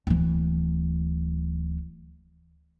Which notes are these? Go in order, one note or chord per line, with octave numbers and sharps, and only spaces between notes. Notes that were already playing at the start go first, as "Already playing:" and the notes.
D1 E3